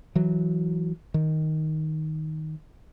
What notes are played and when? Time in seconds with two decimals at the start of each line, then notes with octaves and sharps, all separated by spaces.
0.16 E3 F#3
1.14 D#3